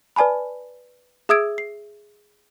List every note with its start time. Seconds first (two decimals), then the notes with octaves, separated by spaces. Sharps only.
0.16 B4 D5 G#5 A5 B5
1.29 G#4 E5 D#6 E6 G#6 D7
1.58 C7